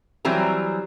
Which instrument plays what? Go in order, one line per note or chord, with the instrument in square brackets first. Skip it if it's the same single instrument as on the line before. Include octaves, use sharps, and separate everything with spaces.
[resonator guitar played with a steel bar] E3 F#3 G3 C4 A#5